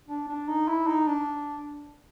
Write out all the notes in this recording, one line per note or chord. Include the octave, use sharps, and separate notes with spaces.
D4
D4
D#4
E4
D#4
D4